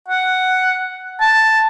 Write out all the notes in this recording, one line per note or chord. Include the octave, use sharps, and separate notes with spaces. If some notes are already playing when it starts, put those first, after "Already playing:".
F#5
A5